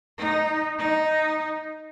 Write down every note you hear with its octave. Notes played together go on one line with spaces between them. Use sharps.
D#4
D#4